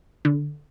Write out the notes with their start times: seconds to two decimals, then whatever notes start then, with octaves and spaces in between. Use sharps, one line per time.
0.25 D3